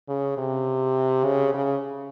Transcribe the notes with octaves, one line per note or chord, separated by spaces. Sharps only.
C#3
C3
C#3
C#3